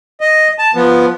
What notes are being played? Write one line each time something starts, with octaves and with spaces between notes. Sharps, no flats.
D#5
A5
F3 B3